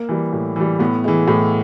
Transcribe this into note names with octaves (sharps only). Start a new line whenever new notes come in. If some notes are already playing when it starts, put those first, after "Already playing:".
Already playing: A#3
E3 G3
A2
E3 G3
A2 B3
E3 G#3
A2